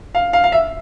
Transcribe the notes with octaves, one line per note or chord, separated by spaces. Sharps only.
F5
F5
F5
E5